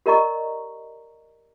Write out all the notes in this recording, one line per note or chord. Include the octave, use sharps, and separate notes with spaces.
G4 A#4 D5 D#5 A#5 C#6